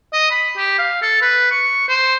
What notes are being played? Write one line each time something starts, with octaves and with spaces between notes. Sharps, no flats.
D#5
B5
G4
F5
A4
B4
C#6
C5